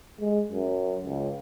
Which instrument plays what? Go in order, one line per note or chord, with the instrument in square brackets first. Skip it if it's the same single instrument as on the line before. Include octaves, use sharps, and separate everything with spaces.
[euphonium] G#3
F#2
C#2